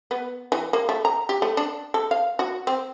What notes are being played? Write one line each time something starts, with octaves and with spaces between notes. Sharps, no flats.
B3
E3
A#3
A3
A#5
G4
A3
D4
A4
F5
F#4
C4